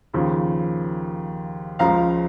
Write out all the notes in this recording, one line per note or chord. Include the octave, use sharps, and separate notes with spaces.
D#2 C#3 F3
C#2 C#3 F3 F5 A#5